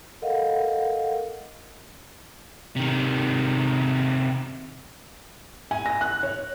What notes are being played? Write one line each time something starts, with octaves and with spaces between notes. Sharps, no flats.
A4 A#4 D#5 F5 F#5
C3 D#3
G#5
A#6
F#6
C#5